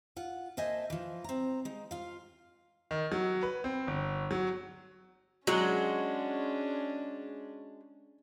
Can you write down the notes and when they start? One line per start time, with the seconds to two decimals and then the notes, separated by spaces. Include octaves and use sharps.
0.16 F4 F#5
0.57 A#3 C5 D#5 E5 G#5 A5
0.90 E3 F3
1.24 C4 A#5
1.65 G#3 D#4
1.91 F4 F5
2.91 D#3
3.12 F#3
3.43 B4
3.64 C4
3.87 G1
4.31 F#3
5.47 F#3 G#3 C#4 D4 F#4